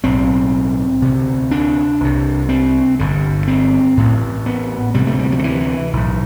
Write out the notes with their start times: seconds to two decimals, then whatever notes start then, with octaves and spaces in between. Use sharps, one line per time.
0.03 B1 A2 C4
1.02 D2 C3
1.51 D4
2.01 C2 C3
2.49 C4
2.99 G1 G2 D3
3.48 C4
3.97 A1 A2
4.46 B3
4.94 D2 C3 G3
5.07 A3
5.19 G3
5.32 F#3
5.39 D3
5.44 E3
5.93 B1 A2